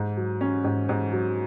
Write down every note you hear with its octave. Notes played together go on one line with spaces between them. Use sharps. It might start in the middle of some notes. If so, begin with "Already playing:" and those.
Already playing: G#2
F#3
C#4
G#2
G#2
F#3